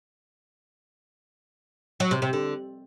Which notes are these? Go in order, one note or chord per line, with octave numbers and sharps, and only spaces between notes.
F#3
C3
C3
D3